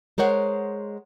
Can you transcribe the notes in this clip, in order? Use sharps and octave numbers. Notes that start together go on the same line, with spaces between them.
G#3 A#4 C5 C#5 F#5